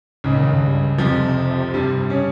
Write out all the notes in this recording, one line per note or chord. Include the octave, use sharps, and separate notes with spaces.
C#2 G#2 C#3
A#2
D#3
G2
F2 C3 F3
G2 G3
C#3 C#4